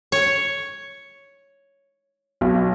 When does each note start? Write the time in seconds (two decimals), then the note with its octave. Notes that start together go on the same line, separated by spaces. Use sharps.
0.12 C#5
2.41 B1